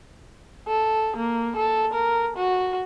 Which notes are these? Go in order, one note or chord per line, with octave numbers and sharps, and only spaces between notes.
A4
A#3
A4
A#4
F#4